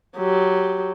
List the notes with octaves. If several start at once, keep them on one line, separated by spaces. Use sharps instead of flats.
F#3 G4